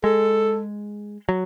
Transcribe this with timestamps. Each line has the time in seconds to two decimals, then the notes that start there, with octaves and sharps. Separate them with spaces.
0.04 G#3 A4
1.29 F#3